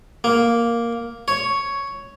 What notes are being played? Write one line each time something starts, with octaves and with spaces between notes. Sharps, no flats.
A#3
C#5